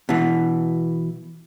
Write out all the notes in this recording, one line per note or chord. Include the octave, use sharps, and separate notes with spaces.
B2 E3